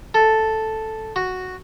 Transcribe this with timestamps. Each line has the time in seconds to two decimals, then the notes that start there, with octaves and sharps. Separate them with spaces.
0.14 A4
1.16 F#4